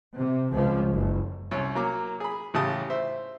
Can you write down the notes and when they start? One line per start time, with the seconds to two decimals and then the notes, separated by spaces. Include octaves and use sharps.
0.17 C3
0.52 C#2 F3
0.92 F#1
1.51 C2 C#4 C#5
1.75 F#3 A#3 D6
2.20 G#4 B5
2.54 A1 C#3 G4 A5 D#6
2.90 C5 E5